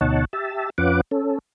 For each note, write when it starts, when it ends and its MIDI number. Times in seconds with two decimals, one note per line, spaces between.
0.01 0.25 38
0.01 0.25 47
0.01 0.25 63
0.01 0.25 73
0.01 0.25 78
0.01 0.25 81
0.33 0.70 67
0.33 0.70 76
0.33 0.70 81
0.78 1.01 41
0.78 1.01 61
0.78 1.01 65
0.78 1.01 71
0.78 1.01 78
0.78 1.01 86
1.11 1.39 61
1.11 1.39 69